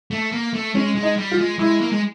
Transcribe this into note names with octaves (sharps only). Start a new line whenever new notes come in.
A3
A#3
A3
G#3 C#4
G#3
D#4
G3
F4
G#3
G#3 E4
A#3
G#3